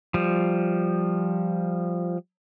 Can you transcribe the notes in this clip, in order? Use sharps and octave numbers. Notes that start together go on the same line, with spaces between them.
F3 G3